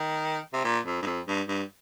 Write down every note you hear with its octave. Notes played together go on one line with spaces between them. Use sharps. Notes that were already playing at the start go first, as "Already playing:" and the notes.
Already playing: D#3
C3
A#2
F2
G2
F2
G2
G2